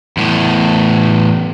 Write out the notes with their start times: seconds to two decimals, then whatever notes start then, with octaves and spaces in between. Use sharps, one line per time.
0.17 E2 A2